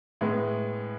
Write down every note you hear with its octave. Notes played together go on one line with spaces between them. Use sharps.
A2 G#3 B3